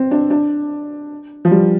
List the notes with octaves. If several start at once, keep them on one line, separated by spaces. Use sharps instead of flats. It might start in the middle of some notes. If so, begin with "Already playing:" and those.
Already playing: C4
D4
D4
F3
G3